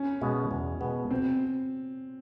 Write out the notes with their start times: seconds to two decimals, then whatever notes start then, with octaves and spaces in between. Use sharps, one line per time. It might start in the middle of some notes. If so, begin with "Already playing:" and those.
Already playing: C#4
0.21 B2 G#3 B3
0.51 E2
0.81 B2 G#3 B3
1.11 C4